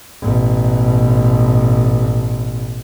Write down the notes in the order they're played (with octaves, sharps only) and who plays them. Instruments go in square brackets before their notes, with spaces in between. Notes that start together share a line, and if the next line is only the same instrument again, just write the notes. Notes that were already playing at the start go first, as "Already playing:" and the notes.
[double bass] A1 B2